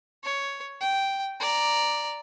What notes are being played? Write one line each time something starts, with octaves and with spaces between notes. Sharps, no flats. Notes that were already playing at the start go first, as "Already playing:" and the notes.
C#5
G5
D5 A#5